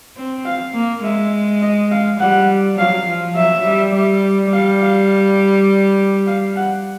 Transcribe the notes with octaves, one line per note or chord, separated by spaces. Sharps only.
C4
F5
A#3
G#3 E5
D#5
F5
G3 F#5
F#3 F5
F3
F#3 E5
G3
G3
G3 F5
F5
F5
F#5